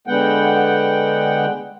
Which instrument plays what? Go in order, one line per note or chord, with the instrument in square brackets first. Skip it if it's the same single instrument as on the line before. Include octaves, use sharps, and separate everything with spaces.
[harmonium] D3 G#3 B3 F#5 G5